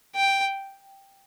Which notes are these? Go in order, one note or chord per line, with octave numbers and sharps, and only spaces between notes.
G5